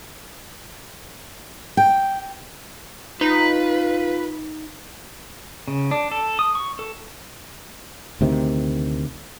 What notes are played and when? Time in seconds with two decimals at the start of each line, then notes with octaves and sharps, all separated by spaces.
1.77 G5
3.21 D#4 F4 B4
5.68 C#3
5.91 D4
6.11 A4
6.39 D#6
6.55 C#6
6.79 A4
8.21 D2 C3 D#3